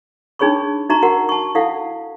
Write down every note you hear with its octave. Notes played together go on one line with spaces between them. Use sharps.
D4 D#4 G#4 C#5 B5 C#6
D#4 F#4 E5 A#5 C#6
F#4 A#4 F#5
A5 C#6
E4 A4 F5 F#5